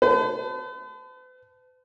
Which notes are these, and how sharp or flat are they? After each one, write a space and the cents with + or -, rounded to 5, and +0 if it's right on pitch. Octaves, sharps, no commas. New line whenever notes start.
B4 +45 A5 +0